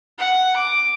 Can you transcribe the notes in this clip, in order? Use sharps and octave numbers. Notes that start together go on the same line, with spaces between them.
F#5
D6